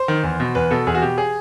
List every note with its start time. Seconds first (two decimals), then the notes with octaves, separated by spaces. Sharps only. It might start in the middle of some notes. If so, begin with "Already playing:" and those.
Already playing: C5
0.08 D#3
0.24 E2
0.40 B2
0.55 E2 B4
0.71 B2 A4
0.87 E2 G#4
0.95 F#4
1.02 B2 G4
1.18 G#4